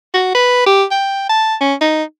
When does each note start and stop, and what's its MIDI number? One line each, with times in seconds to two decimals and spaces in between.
0.14 0.32 66
0.34 0.66 71
0.66 0.84 67
0.91 1.25 79
1.29 1.55 81
1.61 1.74 61
1.81 2.03 63